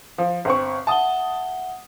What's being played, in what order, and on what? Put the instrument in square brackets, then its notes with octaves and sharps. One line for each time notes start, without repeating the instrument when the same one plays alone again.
[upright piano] F3
G1 C4 C#6
[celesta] E5 F#5 G7 [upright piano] A5 D#6